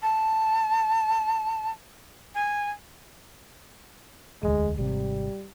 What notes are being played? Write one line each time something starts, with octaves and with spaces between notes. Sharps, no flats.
A5
G#5
E1 D2 G#3
G#1 C3 G3